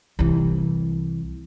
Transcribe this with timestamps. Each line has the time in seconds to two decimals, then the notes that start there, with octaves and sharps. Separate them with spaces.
0.19 C2 E3